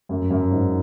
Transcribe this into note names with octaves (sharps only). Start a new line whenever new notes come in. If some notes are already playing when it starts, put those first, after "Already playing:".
F#2
F#2
G#2